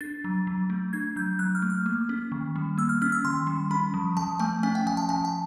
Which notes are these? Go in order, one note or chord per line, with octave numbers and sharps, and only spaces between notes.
D4 A6
F#3
F#3
A3
D4 G#6
F#3 G6
F#3 F#6
F6
A3
F6
A#3
C#4
D#3
G3
A#3 E6
F6
C#4 F6
E6
D#3 C6
G3
C#4 B5
F3
F3 A5
A3 G#5
C#4 G#5
G5
F3 G#5
A5
F3 G#5
A5